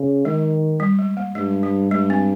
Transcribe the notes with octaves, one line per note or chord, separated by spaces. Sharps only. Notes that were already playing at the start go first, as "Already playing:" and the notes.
Already playing: C#3
D#3 G#3
G3
G#3
A#3
G2 G#3
G3
G2 G#3
C4